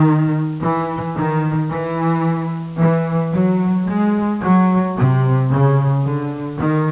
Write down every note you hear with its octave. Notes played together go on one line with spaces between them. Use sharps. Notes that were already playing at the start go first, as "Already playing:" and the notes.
Already playing: D#3
E3
D#3
E3
E3
F#3
G#3
F#3
C3
C#3
D3
D#3